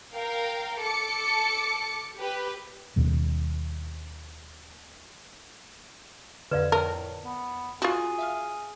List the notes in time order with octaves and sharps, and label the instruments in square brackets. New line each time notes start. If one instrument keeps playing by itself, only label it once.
[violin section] A#4 F5 G5
A4 D6 C#7
G4 B4
[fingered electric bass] D#2 B2 G3
[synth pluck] F2 D3 [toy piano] B4 D5 F5
[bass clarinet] A2 [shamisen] A#4 [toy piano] A5
[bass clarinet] B3
[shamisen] F4 F#4 [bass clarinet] G#4
[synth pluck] E5 F5 F6